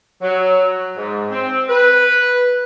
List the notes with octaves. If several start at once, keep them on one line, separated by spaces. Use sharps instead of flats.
F#3
G#2
C4
B4